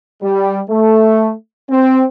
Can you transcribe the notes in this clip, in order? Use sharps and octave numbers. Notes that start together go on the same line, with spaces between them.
G3
A3
C4